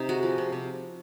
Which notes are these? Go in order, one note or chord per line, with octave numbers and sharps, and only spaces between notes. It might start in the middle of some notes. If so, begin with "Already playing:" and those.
Already playing: C3 D#4
G#3 F#4
F3
C3
C3